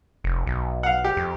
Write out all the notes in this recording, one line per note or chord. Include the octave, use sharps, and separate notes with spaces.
F1
B1
F5 F#5
G4
F2